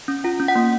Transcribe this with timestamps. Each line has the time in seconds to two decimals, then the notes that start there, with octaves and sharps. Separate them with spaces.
0.08 C#4
0.24 F4 F#5
0.40 C#4
0.48 F#5
0.56 A#3